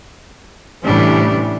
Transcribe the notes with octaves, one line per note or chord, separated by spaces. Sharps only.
A2 C3 E3 G3 C#4 D4